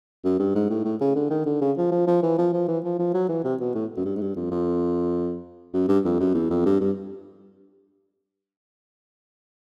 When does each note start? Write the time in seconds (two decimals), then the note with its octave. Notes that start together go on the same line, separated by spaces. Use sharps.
0.24 F#2
0.40 G2
0.55 G#2
0.70 A2
0.85 A2
1.01 C#3
1.16 D3
1.30 D#3
1.46 D3
1.61 C#3
1.77 F3
1.92 F3
2.07 F3
2.23 E3
2.38 F3
2.53 F3
2.68 E3
2.84 F3
2.99 F3
3.14 F#3
3.29 E3
3.44 C3
3.60 B2
3.75 A2
3.97 F#2
4.05 G2
4.16 G#2
4.21 G2
4.36 F2
4.51 F2
5.74 F#2
5.88 G2
6.05 F2
6.20 F#2
6.35 E2
6.50 F2
6.66 G2
6.81 G2